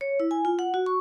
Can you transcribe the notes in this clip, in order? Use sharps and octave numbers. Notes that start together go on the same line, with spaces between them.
C#5
E4
G#5
F4
F#5
F#4
C#6